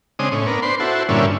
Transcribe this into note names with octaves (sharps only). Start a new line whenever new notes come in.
C#3 G#3 C4 D4 D#6
A2 C#4
B3 D4 A#4
D4 B4 C5 C6
E4 F#4 A4 C5
G2 A#2 D3 C#4 E4